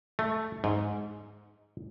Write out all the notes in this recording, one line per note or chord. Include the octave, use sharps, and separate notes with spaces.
A3
G#2